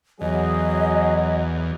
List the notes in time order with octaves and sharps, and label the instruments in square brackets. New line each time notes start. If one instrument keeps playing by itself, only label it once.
[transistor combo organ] E2 [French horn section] F#3 [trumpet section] G#4 [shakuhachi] D#5